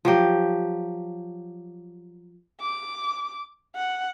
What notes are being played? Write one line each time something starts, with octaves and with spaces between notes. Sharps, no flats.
F3 F#3 G4
D6
F#5